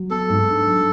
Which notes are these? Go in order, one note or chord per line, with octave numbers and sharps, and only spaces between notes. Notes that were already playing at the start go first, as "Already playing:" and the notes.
Already playing: F#3
B3 A4
G#2
D4
F#3